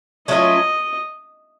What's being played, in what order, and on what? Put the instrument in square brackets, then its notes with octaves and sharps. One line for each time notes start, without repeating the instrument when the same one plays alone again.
[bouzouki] F#3 A3 C#4 F4 [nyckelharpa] D#5